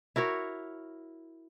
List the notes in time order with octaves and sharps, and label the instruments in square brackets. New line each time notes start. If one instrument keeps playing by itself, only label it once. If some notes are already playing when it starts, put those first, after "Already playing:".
[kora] E4 F#4 A#4 C#5